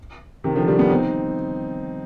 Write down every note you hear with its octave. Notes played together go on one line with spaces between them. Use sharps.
C3 D#3
D3 F3
D#3 G3
G3 B3
C4 D#4